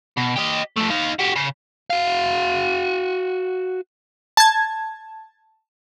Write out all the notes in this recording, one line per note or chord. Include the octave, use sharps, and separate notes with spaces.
B2
G4 D#5
F3 A3
D#4 F5
F#4 G4
C#3
F#4 F5
A5 G#6